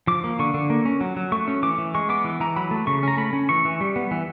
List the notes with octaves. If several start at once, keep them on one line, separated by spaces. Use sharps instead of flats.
F3 D6
A#3
D3 C#6
D3
A#3
C#4
F#3
F#3
A3 C#6
C#4
E3 D6
E3
G#3 C#6
B3 D6
E3
E3 A#5
F#3 B5
A3
C#3 C#6
C#4 A#5
A3 B5
C#4
E3 C#6
E3
G3
B3
E3